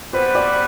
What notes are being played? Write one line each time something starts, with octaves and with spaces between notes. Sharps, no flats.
G3 B3 F#4 B4 C5
D5